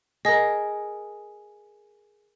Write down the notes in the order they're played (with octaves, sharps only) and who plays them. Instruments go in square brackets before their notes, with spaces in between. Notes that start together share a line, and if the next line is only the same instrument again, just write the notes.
[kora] G#4 A#4 [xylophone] D#5 A#6